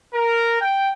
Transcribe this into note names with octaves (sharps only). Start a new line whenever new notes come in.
A#4
G5